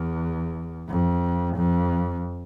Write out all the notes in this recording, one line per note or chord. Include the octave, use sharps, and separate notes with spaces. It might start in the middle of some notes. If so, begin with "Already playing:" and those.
Already playing: E2
F2
F2